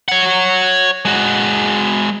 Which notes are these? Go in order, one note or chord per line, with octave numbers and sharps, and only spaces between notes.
C#5 F#5
G#3 F#4